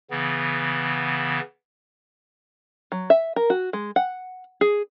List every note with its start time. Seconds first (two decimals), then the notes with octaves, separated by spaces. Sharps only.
0.11 C#3 E3 B3
2.92 F#3
3.10 E5
3.36 A#4
3.50 F#4
3.73 G#3
3.96 F#5
4.61 G#4